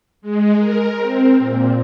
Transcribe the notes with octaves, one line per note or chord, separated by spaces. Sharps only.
G#3
A#4
C4
A#2